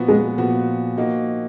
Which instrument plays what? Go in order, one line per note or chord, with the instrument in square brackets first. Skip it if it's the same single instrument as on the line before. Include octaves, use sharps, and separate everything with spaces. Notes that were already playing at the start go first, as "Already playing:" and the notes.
Already playing: [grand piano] A#2 F3 B3 F#4
[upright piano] G#3
[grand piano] A#2 F3 B3 F#4
F3 A#3 D#4 F#4